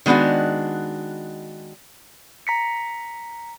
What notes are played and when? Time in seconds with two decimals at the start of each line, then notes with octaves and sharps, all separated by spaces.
0.06 D#3 G#3 B3 D4 F#4
2.47 A#5 B6 C#7